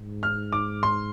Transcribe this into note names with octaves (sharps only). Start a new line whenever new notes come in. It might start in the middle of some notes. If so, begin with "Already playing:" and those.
Already playing: G#2
F6
D6
C6